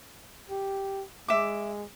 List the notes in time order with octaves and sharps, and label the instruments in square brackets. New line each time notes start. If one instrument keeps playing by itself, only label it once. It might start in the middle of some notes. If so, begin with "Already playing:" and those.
[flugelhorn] G4
[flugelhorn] G#3 [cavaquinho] E5 D6